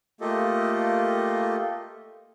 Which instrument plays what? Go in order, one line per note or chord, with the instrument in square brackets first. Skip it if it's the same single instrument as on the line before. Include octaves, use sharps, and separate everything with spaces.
[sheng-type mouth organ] A3 A#3 F4 G4 A4 D#5